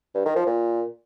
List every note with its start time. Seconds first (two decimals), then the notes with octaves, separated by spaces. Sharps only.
0.15 G2
0.25 D#3
0.36 F3
0.47 A#2